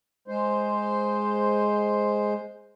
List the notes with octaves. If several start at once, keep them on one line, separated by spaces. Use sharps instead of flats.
G#3 C5